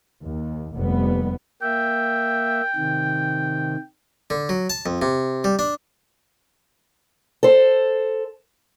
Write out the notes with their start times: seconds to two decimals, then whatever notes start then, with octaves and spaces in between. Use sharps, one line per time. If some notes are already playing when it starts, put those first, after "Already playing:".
0.24 D#2
0.74 F1 D#2 G3 B3
1.62 A#3 E5 G5
2.76 C3 D#3
4.30 D3
4.49 F#3
4.70 A5
4.86 F2
5.02 C3
5.44 G3
5.59 D4
7.43 A4 C5